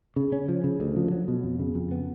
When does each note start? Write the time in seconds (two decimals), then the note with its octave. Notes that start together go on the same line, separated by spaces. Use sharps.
0.16 C#3
0.32 C#4
0.49 F3
0.64 C#3
0.80 D2
0.96 F3
1.11 F#3
1.28 B2
1.43 F2
1.59 C#3
1.75 F2
1.91 B3